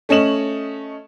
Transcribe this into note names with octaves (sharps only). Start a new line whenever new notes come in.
A3 C#4 D#5 E7 F#7